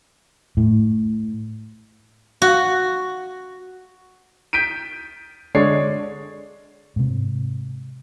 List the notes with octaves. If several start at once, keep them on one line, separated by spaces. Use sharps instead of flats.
A2
F#4
G6 B6 D7 D#7
D3 G#3 C#5 D5 C7
G#2 C3